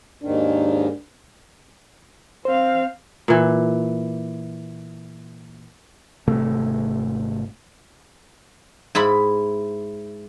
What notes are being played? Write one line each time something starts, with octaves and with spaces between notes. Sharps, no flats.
D#2 G#2 D#3 D4
C4 C5 F5
A#2 E3
G#1 C3 A3
G#2 E4 B5